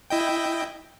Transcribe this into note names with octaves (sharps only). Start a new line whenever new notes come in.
E4 D#5 G5